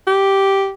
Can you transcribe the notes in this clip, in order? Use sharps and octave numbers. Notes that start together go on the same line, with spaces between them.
G4